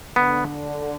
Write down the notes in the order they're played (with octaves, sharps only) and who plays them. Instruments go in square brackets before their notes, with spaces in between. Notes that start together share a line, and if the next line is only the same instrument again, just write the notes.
[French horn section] D3 [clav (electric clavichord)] B3